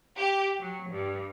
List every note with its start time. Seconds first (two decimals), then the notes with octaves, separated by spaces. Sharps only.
0.17 G4
0.60 F#3
0.90 G2